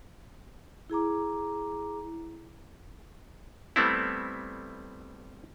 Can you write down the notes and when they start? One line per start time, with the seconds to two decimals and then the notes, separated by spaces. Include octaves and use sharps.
0.90 E4 G#4 A#5 D6
3.76 G3 A3 B3 C4 E4